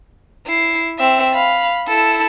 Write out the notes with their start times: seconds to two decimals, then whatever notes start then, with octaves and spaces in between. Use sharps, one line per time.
0.47 E4 C7
0.99 C4 E5
1.34 F5 B5
1.87 E4 A4